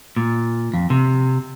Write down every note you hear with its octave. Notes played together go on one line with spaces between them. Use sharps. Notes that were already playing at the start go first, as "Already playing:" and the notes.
A#2
F2
C3